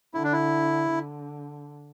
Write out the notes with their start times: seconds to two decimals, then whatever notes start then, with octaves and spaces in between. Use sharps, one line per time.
0.14 D3 E4
0.24 D4
0.32 E4
0.90 D3